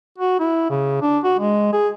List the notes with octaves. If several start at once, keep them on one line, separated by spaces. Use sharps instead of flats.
F#4
E4
C#3
D4
F#4
G#3
G#4